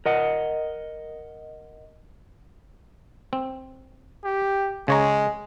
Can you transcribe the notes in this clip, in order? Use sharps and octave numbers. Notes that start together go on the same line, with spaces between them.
A#4 D#5 F#5
C4
G4
C#3 G#3 C#5 A#5